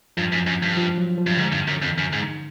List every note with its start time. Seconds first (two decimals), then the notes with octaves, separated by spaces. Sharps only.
0.17 G2 F3
0.33 F#2
0.47 F#2
0.63 G2
0.77 F3
0.98 F#3
1.18 F3
1.27 G2
1.37 G#2 D3
1.52 G2
1.68 F#2
1.83 F2
1.98 F#2
2.13 G#2